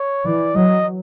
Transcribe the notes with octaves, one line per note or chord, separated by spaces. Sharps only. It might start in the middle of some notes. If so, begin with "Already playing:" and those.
Already playing: C#5
E3 D5
F#3 D#5